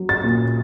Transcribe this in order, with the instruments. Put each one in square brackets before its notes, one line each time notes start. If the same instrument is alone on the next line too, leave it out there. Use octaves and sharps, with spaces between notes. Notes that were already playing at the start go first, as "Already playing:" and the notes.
Already playing: [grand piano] F#3
A6
A#2